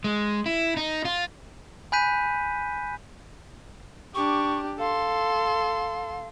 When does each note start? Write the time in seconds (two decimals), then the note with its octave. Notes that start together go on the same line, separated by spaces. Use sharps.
0.04 G#3
0.46 E4
0.77 D#4
1.05 F4
1.92 G#5 B5 F#6 G6 B6 D#7
4.15 D4 G4 C#6
4.79 A4 F5 C6